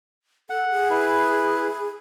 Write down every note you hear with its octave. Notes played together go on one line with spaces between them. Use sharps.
A4 F#5
G#4
E4 B4